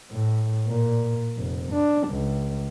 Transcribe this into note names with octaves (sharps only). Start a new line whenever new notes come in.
A2
A#2
F1
D4
C#2